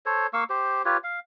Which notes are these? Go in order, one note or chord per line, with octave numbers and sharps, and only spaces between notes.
A4 C5 C#5
A#3 F5 C#6 E6
G4 C5
F4 G4 B4 C#5
F5